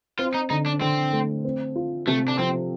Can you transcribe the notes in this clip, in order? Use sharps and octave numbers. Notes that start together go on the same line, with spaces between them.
C4 F4
D#4
D3 D#4
D4
D3 C4
A3
C4
F4
C3 A3
D4
F3 C4